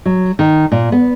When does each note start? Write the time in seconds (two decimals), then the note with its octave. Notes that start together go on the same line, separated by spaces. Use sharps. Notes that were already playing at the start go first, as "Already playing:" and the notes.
0.06 F#3
0.39 D#3
0.72 A#2
0.92 B3